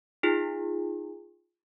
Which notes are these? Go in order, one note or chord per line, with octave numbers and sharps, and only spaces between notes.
D#4 F4 G#4